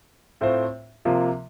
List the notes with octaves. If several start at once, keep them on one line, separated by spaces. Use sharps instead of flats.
A2 A3 C4 F4 C5
C3 F3 A#3 F4